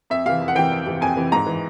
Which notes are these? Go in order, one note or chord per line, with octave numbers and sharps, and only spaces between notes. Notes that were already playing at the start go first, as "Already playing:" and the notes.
F2 E5
C3 E3 F5
F2
F#5
C3 E3 G5
F2
C3 E3
F2 G#5
C3 E3
G#2 A#5
E3